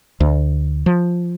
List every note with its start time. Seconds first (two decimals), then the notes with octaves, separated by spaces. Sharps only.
0.20 D2
0.86 F3